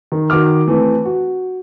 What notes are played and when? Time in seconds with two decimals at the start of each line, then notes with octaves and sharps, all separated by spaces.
0.12 D#3
0.30 D#3 F#4 D6 F6
0.68 E3 A3 C4
1.05 F#4